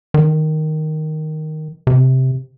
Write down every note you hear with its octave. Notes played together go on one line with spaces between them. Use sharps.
D#3
C3